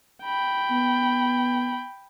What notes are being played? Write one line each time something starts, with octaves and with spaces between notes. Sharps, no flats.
G5 B5
B3